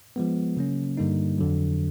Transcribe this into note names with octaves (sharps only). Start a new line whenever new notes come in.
F3 G#3 B3
C#3 F#3 A#3 C#4
G2 D3 G3 A#3 D#4
F2 D3 F#3